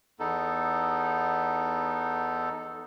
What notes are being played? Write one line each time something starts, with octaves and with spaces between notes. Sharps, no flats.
E2 B3 D#4 A4